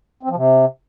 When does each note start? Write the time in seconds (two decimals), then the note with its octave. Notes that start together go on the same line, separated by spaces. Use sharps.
0.23 C4
0.30 F3
0.36 C3